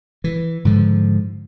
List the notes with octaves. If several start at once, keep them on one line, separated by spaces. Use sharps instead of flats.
E3
G#2 D3 F3